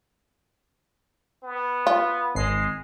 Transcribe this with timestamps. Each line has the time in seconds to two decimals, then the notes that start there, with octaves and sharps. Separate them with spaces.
1.43 B3
1.87 F4
2.35 G#1 G#3 C7